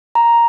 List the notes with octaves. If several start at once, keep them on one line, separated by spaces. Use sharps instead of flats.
A#5